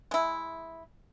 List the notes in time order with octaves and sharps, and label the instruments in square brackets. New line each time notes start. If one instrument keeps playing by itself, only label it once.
[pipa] G#3 E4